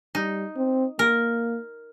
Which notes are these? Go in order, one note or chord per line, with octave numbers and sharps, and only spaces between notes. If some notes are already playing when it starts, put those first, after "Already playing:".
G3 D#4
C4
A#3 A#4